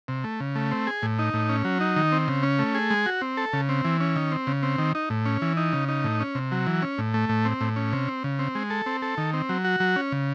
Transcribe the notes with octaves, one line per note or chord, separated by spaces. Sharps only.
C3
A3
C#3
A3
C4
G#4
A2
D#4
A2
C#4
F#3
D#4
D#3
C4
C#3
C#4
A3
G#4
G#3
F#4
C4
A4
C#3
C4
E3
C#4
D#3
C4
C#3
C4
D#3
D#4
A2
C#4
E3
D#4
C#3
D#4
A2
C#4
C3
F#3
E3
C#4
A2
A3
A2
C4
A2
C#4
C3
C4
C#3
C4
G#3
A4
C4
A4
D#3
C4
F#3
F#4
F#3
C#4
C#3